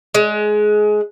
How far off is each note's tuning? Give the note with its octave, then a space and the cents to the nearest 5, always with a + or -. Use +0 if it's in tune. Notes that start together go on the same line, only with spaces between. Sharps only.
G#3 +20